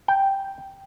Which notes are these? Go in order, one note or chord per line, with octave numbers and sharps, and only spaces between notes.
G5